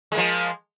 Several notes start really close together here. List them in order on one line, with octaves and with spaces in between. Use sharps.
G#3 A#3 F3